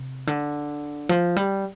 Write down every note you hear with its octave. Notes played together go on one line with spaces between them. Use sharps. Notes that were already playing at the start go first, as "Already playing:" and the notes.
Already playing: C3
D3
F3
G3